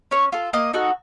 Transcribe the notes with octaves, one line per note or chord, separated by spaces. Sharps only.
C#4 C#5
F4 A4
A#3 D#5
D#4 F#4 A4